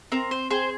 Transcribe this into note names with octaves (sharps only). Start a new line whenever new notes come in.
C4 A#4
C5
G#4 C5